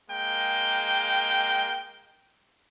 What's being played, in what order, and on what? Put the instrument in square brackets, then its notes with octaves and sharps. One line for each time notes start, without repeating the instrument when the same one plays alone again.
[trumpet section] G#3 A#3 G5